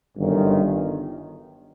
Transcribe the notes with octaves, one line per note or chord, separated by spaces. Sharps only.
G1 F#2 D#3